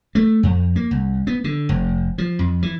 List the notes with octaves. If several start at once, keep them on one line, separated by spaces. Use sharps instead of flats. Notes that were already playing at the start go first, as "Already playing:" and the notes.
A3
F2
A#3
C2
B3
D3
F1
F3
F2
E3